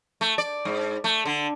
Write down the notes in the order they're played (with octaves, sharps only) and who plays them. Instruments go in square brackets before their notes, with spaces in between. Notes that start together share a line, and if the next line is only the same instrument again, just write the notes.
[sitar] A3
D5
G#2
A3
D3